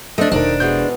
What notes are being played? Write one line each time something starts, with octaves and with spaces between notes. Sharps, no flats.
A3 D4 C5 D#5
E1 D#3 D4 D#4 A#4
B2 E3 G#3 B3 G6